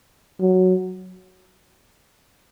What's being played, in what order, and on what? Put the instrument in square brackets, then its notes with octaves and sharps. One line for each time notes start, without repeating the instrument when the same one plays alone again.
[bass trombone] F#3